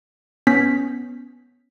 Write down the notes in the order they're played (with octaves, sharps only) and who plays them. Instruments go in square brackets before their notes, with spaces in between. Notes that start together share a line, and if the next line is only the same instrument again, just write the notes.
[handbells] B3 C#4 B6